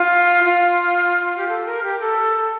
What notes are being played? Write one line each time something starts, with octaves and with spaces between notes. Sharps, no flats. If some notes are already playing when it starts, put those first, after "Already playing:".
Already playing: F4
F4
G4
A4
A#4
G4
A4